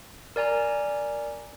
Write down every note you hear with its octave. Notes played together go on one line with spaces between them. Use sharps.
A#4 D5 G#5 A#5